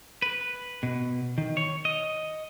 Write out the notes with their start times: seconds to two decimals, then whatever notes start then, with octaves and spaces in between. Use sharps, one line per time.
0.22 B4
0.83 B2
1.38 D#3
1.57 C#5
1.85 D#5